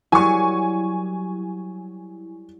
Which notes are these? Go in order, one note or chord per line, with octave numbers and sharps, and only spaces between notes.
F#3 G3 E4 G#5 C#6